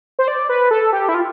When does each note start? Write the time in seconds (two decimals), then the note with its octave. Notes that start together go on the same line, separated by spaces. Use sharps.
0.19 C5
0.28 D5
0.49 B4
0.71 A4
0.93 G4
1.09 E4
1.14 F4